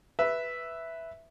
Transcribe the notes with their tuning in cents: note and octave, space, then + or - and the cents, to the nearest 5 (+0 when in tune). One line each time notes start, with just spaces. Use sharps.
B4 +0 E5 +0